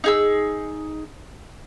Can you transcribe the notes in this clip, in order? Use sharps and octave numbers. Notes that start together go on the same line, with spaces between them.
D#4 G#4 E6